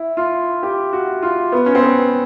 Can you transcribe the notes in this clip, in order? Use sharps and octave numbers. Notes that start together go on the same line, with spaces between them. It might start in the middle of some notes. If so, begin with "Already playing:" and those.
Already playing: E4
F4
G4
F#4
F4
B3
C#4
C4
B3